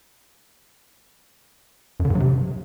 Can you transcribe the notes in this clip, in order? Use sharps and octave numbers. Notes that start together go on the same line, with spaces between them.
F#2
D3
G2
F#3
C3